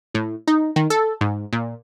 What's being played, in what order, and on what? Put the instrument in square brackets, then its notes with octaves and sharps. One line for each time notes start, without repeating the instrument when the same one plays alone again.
[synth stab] A2
D#4
D#3
A4
G#2
A#2